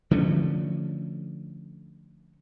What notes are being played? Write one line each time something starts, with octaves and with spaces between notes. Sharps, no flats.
D3 F3 A3 C#4